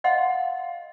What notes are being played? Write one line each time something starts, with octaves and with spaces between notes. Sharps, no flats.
D#5 F5 F#5 C6